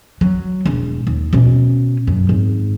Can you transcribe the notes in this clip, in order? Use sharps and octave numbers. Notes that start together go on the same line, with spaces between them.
F#3
E1
D#2
B2 C#4
F#2
G#1